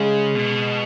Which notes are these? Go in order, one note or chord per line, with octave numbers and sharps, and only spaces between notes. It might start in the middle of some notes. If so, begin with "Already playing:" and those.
Already playing: C#3 G#3
B2